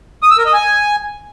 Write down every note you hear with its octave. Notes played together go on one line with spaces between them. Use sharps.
D#6
E6
A#4
D#5
G#5